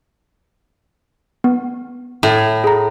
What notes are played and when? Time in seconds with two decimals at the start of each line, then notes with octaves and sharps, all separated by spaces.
1.44 B3
2.23 A2
2.64 G#4 A#5